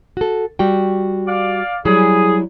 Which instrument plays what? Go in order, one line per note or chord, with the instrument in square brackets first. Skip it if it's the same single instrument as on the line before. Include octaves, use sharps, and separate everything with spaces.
[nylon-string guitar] F#4 A4
G3 F#4 G5
[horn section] D5 F5
[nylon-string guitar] F#3 G3 E4 [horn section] G#4